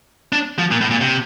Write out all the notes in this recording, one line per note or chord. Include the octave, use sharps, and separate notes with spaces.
D4
F3
A#2
A2
A#2
C3